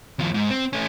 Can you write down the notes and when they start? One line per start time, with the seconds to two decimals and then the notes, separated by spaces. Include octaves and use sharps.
0.19 D#2 F3
0.34 G#2
0.50 C4
0.73 A3 C#4